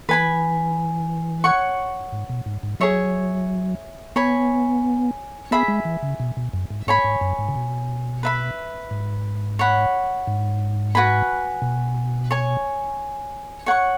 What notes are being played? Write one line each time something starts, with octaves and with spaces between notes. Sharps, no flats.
E3 B4 G#5 B5
C#5 F#5 C#6
G#2
B2
G#2
G#2
F#3 G#4 C#5 E5
B3 C#5 G#5 B5
B3 G#4 E5 B5
G#3
E3
C#3
B2
B2
F#2
G#2
G#2 C#5 G#5 B5
G#2
F#2
G#2
C#3
B2
B4 E5 B5
G#2
C#5 F#5 B5
G#2
F#4 B4 G#5 B5
B2
C#5 G#5 C#6
C#5 F#5 C#6